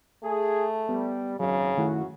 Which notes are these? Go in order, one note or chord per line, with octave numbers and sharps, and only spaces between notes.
A3 G#4
G3 B3
G#1 F#2 C#3 F#3
F#2 D#3 A3 E4 F#4